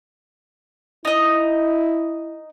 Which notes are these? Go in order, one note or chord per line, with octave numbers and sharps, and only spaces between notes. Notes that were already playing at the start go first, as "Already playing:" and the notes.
D#4 E4 D#5